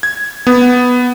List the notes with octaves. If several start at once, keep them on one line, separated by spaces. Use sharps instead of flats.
G#6
B3